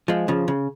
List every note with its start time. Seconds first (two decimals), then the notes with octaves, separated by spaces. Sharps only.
0.08 F3 G#3
0.28 C#3 F3
0.48 C#3